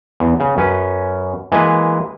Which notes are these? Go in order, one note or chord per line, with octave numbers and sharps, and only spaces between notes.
E2
C#3
F#2 C#4 B4
E3 G#3 A#3 B4